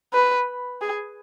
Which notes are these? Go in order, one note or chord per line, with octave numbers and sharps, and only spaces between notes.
B4
G#4